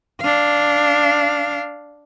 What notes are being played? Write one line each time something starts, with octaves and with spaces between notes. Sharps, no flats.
D4 F5